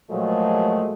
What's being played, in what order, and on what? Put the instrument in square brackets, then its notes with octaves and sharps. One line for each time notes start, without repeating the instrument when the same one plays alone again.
[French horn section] A#2 F3 F#3 G#3 A3